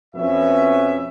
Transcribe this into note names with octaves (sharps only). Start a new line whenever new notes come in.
F2 B2 C#4 B4 E5